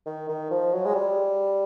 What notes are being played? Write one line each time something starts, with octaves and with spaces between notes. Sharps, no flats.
D#3
D#3
F3
F#3
G#3
G3